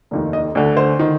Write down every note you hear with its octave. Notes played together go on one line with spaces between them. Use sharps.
F1 D#2 D#3
D#5
D2 D3
C5
D#3